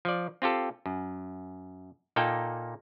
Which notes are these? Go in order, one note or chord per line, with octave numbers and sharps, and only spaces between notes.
F3 D5
C4 F4 G4 A4
F#2
A#2 A#3 D#4 A4 G5